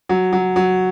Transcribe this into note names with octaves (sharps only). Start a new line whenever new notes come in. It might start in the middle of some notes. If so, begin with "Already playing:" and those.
F#3
F#3
F#3